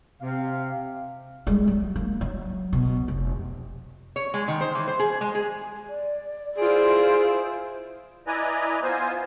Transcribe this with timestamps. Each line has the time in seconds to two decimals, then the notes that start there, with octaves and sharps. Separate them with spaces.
0.21 C3 F5
1.47 G3 G#3
1.68 F#3
1.96 A#3
2.21 F#3
2.73 B2
3.08 F1
4.16 C#5
4.34 G#3
4.48 D#3
4.61 C5
4.75 E3
4.88 C5
4.99 G#4
5.21 G#3
5.35 G#4
5.89 D5
6.58 E4 F4 G#4 C5 D7
8.27 E4 B4 D5 D#5 G#5 A#5
8.83 B3 F4 C5 G#5